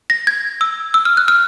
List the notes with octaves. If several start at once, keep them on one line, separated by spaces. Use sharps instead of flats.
A#6
G#6
E6
E6
F6
F#6
F6